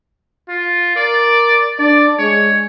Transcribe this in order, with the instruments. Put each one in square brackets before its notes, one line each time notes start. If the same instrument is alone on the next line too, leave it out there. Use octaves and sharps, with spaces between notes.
[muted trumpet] F4
[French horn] A#4 [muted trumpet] D5
[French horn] D4 [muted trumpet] D5
[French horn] G#3 [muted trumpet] C#5